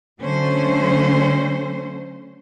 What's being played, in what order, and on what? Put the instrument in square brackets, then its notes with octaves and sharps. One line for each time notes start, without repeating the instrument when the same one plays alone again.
[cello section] D3 F#3 A3 C#4 C5